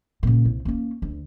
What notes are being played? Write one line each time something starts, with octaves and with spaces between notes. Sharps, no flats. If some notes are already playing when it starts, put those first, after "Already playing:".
A#2 C#3
C2
A#3 C#4
D2